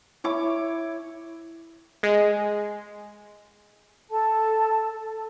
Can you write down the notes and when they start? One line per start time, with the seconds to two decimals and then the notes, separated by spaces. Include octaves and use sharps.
0.24 E4 C#5 D6
2.03 G#3
4.10 A4 A5